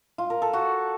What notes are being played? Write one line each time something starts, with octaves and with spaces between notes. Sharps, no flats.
F4
A#4
A4
F#4